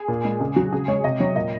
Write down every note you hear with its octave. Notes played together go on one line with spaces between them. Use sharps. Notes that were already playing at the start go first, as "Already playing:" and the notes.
Already playing: G#4
A#2
G#3
C#3 G#4
F#3 F#4
C#3 G#4
G#3 C#5
C3 D#5
F#3 C#5
A#2 D#5